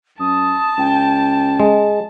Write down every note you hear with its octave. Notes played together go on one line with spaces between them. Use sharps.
F#2 A5 D#6
C#2 G5
G#3